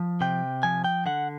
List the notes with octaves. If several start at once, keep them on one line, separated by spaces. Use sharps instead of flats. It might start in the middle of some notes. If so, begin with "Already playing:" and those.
Already playing: F3
C3 G5
F3 G#5
G5
D3 F#5